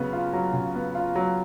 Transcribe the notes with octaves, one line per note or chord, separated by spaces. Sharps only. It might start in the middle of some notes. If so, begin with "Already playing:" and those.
Already playing: C#3 F#3 B3
F4
F#3
C#3
B3
F4
F#3